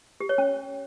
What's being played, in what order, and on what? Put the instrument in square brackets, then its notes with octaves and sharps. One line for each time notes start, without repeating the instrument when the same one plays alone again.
[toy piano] G4
C#5
C#4